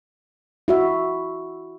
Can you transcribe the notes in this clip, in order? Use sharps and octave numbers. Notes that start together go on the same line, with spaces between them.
E4 F#4 E5